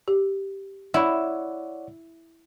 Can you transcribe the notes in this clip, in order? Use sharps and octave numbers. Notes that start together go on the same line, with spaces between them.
G4
E4 C#5 D5 F#5